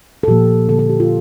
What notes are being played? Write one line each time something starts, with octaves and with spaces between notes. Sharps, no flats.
A4
A#2 F3 A#3 G4
D3 F3 A#3 A4
A4
G4
F4